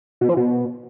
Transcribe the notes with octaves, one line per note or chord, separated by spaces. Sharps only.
B2
F3
B2